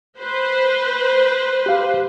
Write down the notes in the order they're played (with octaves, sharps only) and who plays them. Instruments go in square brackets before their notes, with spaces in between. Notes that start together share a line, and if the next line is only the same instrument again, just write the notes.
[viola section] B4 C5
[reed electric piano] G4 F5